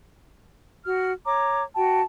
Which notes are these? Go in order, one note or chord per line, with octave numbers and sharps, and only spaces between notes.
F#4 F6
C#5 A#5 D6
F#4 G5 A5